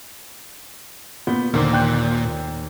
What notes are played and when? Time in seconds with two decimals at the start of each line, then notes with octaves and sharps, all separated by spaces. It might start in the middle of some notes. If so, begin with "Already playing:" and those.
1.27 A#2 B3 G6
1.54 D#2 A#2 D3 C5
1.73 G5 F#6 G6